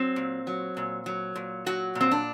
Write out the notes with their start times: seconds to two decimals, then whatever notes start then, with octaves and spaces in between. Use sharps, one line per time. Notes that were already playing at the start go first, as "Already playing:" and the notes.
Already playing: F#3 C4
0.16 A#2
0.47 F#3
0.77 A#2
1.06 F#3
1.36 A#2
1.66 F#3 F#4
1.95 A#2
2.01 C4
2.11 D4